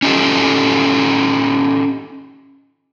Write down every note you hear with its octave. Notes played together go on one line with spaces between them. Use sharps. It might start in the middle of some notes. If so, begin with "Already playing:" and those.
C#4 D#4 F4 G4 A4